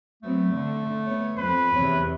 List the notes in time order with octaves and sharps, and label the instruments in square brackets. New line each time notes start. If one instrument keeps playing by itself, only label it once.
[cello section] F#3 B3 C4 [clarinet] A3
[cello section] D3
B3 C#5
[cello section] F2 C5 [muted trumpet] B4
[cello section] E2 C3 E3 [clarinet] C#5